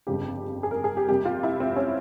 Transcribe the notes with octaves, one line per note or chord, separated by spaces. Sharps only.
G1 F2 C#3 G3 G4
G#4
A#4
G#4
G4
F2 C3 G3 A#3 G4
F4
E4
C4
C#4